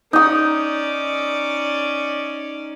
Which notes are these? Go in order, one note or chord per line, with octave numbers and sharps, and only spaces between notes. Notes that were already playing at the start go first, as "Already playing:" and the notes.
C#4 D#4 D5 D#6